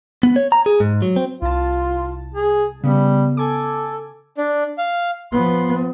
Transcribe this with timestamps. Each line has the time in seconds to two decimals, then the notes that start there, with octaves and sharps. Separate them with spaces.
0.23 B3
0.36 C#5
0.52 A#5
0.66 G#4
0.80 G#2
1.02 F#3
1.16 C4
1.42 C2 F4 A5
2.35 G#4
2.84 C#3 G3 B3
3.37 A4 G#5 D6
4.38 D4
4.78 F5
5.32 F3 B3 C6